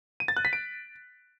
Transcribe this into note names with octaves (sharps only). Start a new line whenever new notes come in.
D#7
A6
F#6
B6
D7